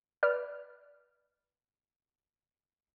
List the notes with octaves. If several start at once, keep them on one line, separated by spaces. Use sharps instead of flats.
B4 D5 F6